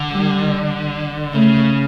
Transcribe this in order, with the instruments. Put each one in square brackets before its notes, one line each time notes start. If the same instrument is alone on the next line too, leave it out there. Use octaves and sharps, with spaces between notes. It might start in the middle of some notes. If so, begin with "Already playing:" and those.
Already playing: [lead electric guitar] D3
[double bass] G3
[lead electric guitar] C#3 [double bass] A3